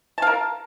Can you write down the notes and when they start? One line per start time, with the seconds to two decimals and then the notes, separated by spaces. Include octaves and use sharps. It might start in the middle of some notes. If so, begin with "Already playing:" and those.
0.18 A5
0.22 F5
0.27 A#4